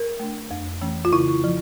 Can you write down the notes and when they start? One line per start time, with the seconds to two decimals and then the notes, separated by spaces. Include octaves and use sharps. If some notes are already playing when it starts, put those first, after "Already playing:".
Already playing: A#4
0.20 A3 D4
0.51 F2
0.81 E3 A3 C#4
1.05 F4
1.12 C#3 E4
1.44 F3